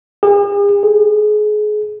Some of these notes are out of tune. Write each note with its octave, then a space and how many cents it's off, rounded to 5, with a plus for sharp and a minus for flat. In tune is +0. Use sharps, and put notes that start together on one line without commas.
G#4 -45
G#4 +30